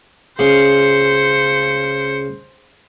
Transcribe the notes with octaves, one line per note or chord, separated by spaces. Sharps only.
C#2 C#3 C5 C6 C#7